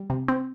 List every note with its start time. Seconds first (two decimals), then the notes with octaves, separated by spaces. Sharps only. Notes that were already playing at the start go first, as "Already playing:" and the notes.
Already playing: G3
0.10 C3
0.28 C4